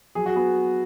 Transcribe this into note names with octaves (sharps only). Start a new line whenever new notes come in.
F#3 G#4
F#4
B3 G#4